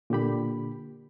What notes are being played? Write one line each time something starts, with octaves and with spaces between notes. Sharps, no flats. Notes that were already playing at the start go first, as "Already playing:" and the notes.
A#2 D3 G4 B5